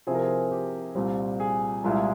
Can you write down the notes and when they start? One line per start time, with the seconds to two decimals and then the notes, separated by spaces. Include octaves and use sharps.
0.07 C3 F3 C4 E4 G#4
0.15 A#4
0.23 G#4
0.51 G4
0.95 C2 A#2 G3 C4
1.40 G#4
1.84 C2 A#2 G#3 E4